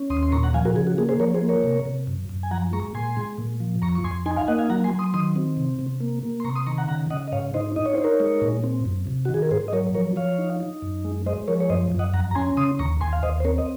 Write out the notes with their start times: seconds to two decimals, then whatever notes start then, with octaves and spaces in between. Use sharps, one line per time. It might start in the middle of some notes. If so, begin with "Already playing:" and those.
Already playing: C#4
0.10 D#2 C6 D#6
0.23 C6
0.32 A#2 A#5 C#6
0.43 F#5 A#5
0.54 F3 F5 G#5
0.65 F#4 A#4
0.76 C#3 G#4
0.87 F#4
0.98 A#3 G#4
1.09 G#4 C5
1.19 F3 A#4 C#5
1.34 G#4 C5
1.42 A#3
1.49 A#4 C#5
1.64 C3
1.85 C3
2.07 F#2
2.29 F#2
2.43 G#5
2.51 F3 F#5 A#5
2.73 G#3 A#5 C#6
2.95 A#2 G#5 C6
3.17 G#3
3.38 A#2
3.60 F3
3.82 F2 A#5 C#6
3.95 C#6
4.04 F2 G#5 C6
4.26 D#4 G#5 C6
4.36 F5 G#5
4.48 A#3 D#5 F#5
4.58 F5 G#5
4.70 F#3 F#5 A#5
4.84 G#5 C6
4.92 F#3
4.99 C6 D#6
5.14 D#3 C6 D#6
5.36 C4
5.57 C3
5.79 C3
6.01 A#3
6.23 A#3
6.40 C6
6.45 C3 A#5 C#6
6.55 C6 D#6
6.67 D#3 A#5 C#6
6.78 F#5 A#5
6.88 C#3 F#5 A#5
7.10 C#3 D#5 F#5
7.27 D#5
7.32 G#2 C#5 F5
7.54 D#4 C5 D#5
7.76 D#4 D#5
7.86 C#5
7.95 D#4 C5
8.04 A#4 C#5
8.20 G#3
8.42 A#2
8.64 C4
8.85 F#2
9.07 C3
9.25 F#4
9.29 D#3
9.34 G#4
9.42 A#4
9.51 G#2 G#4 C5
9.68 D#5
9.73 F#3 A#4 C#5
9.94 F3 A#4 C#5
10.16 F3 C#5 F5
10.39 D#4
10.60 D#4
10.82 F#2
11.05 G#3
11.26 G#3 C5 D#5
11.48 F3 A#4 C#5
11.60 C#5
11.70 F#2 C5 D#5
11.92 F#2
11.99 D#5 F#5
12.13 F2 F#5 A#5
12.31 A#5
12.35 C#4 G#5 C6
12.57 C#3 C6 D#6
12.79 D#2 A#5 C#6
13.01 D#2 G#5 C6
13.13 F5
13.23 D#2 C5 D#5
13.40 C5
13.44 C4 A#4 C#5
13.58 D#5